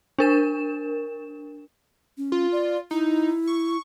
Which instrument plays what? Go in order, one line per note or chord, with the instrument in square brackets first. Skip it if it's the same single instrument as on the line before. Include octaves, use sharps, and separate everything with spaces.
[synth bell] D4 A#4 E7
[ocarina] C#4
[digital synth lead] F4
[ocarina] D5
[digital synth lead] D#4 [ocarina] E4
[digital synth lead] C#6